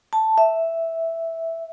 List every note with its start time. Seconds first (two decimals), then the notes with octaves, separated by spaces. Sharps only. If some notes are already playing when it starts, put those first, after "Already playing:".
0.13 A5
0.38 E5